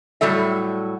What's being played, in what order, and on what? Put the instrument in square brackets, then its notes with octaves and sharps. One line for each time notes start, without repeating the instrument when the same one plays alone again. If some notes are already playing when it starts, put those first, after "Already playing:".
[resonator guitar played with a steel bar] A2 F#3 G3 A4 E5